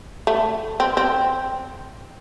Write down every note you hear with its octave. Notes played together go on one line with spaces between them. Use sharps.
A3
C4
C4